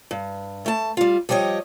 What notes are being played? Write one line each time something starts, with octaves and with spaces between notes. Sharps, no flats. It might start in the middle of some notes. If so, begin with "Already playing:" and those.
G2
A3 A5
G3 F4
F3 G3 G4 C#5 D#5